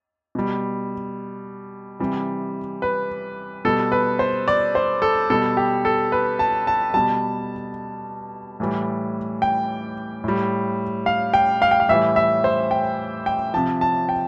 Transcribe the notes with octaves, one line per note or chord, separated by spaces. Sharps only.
B2 G3
C3 E3 G3
B4
B2 G3 A4
B4
C5
D5
C5
A4
B2 G3 A4
G4
A4
B4
A5
A5
B2 G3 A5
A2 E3 G3
G5
A2 G3
F5
G5
F5
G5
F5
A2 E3 G3 E5
E5
C5
G5
G5
C3 F3 A5
A5
G5